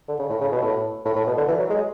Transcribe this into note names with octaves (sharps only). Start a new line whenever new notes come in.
D3
C#3
A2
C#3
B2
A2
A2
A2
B2
D3
E3
F#3
G#3